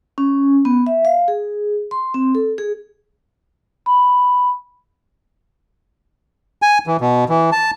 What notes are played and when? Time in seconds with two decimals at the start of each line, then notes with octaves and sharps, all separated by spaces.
0.18 C#4
0.65 B3
0.86 E5
1.05 F5
1.28 G#4
1.91 C6
2.14 C4
2.35 A4
2.58 G#4
3.86 B5
6.62 G#5
6.87 E3
7.01 B2
7.29 E3
7.52 A5